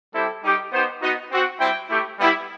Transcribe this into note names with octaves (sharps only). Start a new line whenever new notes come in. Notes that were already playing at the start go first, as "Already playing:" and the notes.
G3 C4 E4 G4 A4
G3 D#4 G4
B3 D#4 G4 C5
B3 D#4 F#4 D#5
C4 F#4
G3 C4 E4 G5
A3 E4 G4
G3 B3 E4 G4